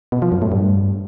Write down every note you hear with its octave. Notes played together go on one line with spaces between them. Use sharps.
B2
F3
F#2
A2
G2